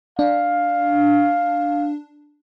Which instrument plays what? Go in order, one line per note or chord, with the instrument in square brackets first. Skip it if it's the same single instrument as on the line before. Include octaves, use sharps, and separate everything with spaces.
[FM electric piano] D4 [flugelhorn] F5